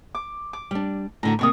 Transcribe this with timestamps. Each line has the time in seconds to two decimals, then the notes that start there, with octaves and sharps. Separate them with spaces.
0.15 D6
0.53 D6
0.71 G3 D4
1.23 A2 D3 F#4 A#5
1.39 D#2 C3 A#3 C#6 D#6